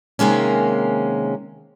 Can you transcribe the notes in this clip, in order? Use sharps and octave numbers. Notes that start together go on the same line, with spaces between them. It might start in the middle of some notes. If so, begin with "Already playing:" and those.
C3 D#3 G#3 A#3 C#4